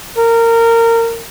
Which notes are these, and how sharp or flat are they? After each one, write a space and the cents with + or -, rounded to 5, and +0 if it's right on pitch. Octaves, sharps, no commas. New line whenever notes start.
A#4 -20